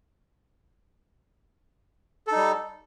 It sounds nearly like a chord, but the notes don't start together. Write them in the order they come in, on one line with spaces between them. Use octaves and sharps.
A4 D#4 G3